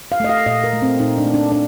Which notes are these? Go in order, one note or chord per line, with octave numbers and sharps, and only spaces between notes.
F5
A3 D#5
F5
A#2 D#5
A#4
A3
C4
A#2 D#4
D4
A3
D4
D4